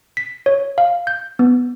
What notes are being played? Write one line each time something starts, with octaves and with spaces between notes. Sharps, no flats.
B6
C#5
F5
G6
B3